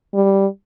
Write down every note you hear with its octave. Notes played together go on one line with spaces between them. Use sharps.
G3